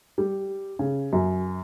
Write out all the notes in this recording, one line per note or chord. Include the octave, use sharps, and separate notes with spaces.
G3
C#3
F#2